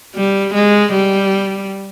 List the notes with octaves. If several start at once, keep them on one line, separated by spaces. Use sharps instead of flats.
G3
G#3
G3